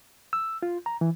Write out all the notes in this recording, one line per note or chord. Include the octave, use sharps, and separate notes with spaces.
E6
F4
A#5
E3